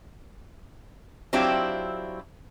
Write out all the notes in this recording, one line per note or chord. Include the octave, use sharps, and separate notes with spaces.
F#3 C4 D4 E4 F4 G4